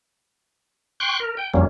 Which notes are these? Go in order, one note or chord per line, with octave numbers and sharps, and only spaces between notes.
G5 C6 C#6 F#6
A#4
G5
F2 F#3 G3 A#3 C#4